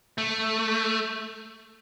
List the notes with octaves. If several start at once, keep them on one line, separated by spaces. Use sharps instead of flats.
A3